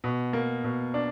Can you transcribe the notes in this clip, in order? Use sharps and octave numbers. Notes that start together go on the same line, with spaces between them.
B2
A#3
B2
D4